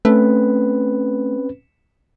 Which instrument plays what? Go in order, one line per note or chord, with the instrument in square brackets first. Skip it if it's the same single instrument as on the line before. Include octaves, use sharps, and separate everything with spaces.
[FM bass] A3 [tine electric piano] C4 C#4 B4